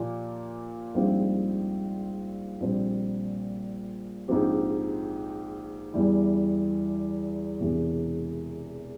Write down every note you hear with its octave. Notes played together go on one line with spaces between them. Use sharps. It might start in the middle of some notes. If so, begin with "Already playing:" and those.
Already playing: A#2 F3 A#3 G4
A#1 G#2 G3 C4 F4
A#1 A#2 G3 C4
A#1 G#2 F3 C4 G4
E2 E3 G3
E1 E2 C3